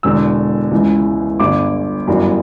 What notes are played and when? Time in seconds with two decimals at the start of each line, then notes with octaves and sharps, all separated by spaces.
0.03 E1 E2 D3 E6
0.71 C#2 C#3 E3
1.39 G1 G2 D3 D6
2.07 G1 F#2 E3 G3